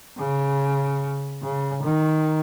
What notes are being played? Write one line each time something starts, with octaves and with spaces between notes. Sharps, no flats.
C#3
C#3
D#3